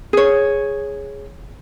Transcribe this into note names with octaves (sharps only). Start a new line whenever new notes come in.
G#4 C#5